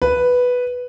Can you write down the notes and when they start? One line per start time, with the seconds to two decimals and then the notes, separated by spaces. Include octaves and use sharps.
0.02 B4